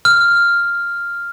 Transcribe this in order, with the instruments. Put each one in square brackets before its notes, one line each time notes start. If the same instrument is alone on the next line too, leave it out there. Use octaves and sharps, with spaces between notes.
[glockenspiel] F6